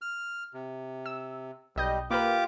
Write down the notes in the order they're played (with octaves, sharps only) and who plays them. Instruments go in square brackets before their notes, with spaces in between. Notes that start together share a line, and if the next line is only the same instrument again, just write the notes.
[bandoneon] F6
C3
[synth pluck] E6
[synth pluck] B1 D#5 G6 [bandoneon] G3
[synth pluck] A#3 A#4 B4 [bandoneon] F4 G4 D6